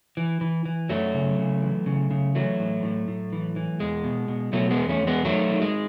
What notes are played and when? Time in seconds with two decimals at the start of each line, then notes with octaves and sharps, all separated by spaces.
0.17 E3
0.41 E3
0.66 E3
0.89 F#2 F#3 A3
1.14 C#3
1.39 C#3
1.62 E3
1.86 C#3
2.11 C#3
2.35 E3 F#3 A3
2.59 A2
2.83 A2
3.08 A2
3.33 E3
3.56 E3
3.80 E2 G#3
4.04 B2
4.28 B2
4.53 B2 F#3 A3
4.71 G#3 B3
4.77 E2
4.89 A3 C#4
5.01 E2
5.07 G#3 B3
5.25 D#3 F#3 A3
5.50 D#3
5.62 G#3